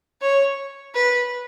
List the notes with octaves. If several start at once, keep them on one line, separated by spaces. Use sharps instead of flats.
C#5
B4